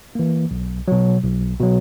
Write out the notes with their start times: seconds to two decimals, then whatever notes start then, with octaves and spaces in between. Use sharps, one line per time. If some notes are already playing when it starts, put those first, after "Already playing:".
0.15 E3 A#3
0.51 B1
0.88 B2 F#3
1.24 B1
1.60 B2 F#3